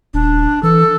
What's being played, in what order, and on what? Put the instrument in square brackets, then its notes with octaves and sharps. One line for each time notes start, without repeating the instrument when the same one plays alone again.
[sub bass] D#1 [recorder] D4
[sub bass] E3 [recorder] A4